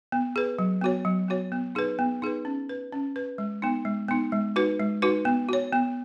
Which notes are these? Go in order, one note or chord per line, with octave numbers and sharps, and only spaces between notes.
B3
G#4 B4
F#3
B3 F#4 C#5
F#3
B3 F#4 C#5
B3
D#4 G#4 B4
B3
D#4 G#4 B4
C#4
B4
C#4
B4
G#3
B3 D#4
G#3
B3 D#4
G#3
D#4 F#4 B4
G#3
D#4 F#4 B4
B3
F#4 C#5
B3